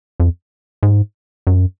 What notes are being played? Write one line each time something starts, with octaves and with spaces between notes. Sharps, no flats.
F2
G#2
F#2